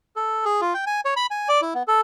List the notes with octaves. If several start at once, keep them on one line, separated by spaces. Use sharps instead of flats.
A4
G#4
F4
G5
G#5
C#5
B5
G#5
D5
E4
B3
A4